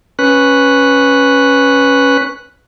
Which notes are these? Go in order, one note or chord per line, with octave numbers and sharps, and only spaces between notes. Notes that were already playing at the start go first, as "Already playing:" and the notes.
C#4 B4 F#6